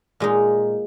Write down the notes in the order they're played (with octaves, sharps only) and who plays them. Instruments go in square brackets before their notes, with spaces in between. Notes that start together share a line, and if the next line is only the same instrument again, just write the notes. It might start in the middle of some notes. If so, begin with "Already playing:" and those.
[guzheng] A#2 G#3 D#4